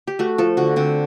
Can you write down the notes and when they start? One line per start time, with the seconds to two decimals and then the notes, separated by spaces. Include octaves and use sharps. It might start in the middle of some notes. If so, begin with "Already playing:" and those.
0.07 G4
0.19 A3 F#4
0.38 F3 A4
0.57 D3 F#4
0.76 D3 C4